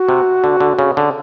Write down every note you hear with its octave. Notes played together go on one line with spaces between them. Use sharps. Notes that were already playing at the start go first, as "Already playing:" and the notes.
Already playing: F#4
C3
D3
D3
C#3
D3